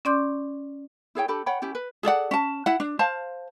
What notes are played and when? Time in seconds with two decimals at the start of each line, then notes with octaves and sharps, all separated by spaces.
0.05 C#4 D5 C6 D6 G6
1.15 E4 G#4 C#5 G5
1.28 D4 G4 A4 B5
1.46 C#5 F#5 G5 B5
1.62 C#4 E4 G4
1.75 B4
2.03 G#4 A4 D5 F#5
2.31 C#4 A5
2.66 E4 F#5
2.80 D4
2.99 C5 F5 A5